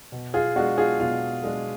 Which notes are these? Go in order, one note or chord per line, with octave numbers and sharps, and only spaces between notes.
B2
F4 G#4
G#3 D4 F#4
F4 G#4
B2 F4
G#3 D4